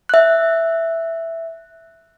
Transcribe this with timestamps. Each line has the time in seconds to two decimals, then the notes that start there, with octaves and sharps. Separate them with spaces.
0.09 E5 F#6